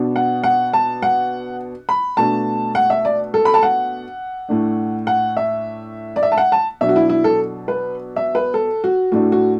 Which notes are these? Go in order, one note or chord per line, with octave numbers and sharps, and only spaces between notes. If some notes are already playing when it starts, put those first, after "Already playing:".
Already playing: B2 B3 D4
F#5
F#5
A5
F#5
B5
B2 A3 D4 A5
F#5
E5
D5
A4
B5
A5
F#5
A2 A3 D4
F#5
E5
D5
E5
A5
F#5
A5
B2 F#3 D4 E5
F#4
E4
E4
A4
B4
E5
B4
A4
F#4
A2 A3 D4 F#4
F#4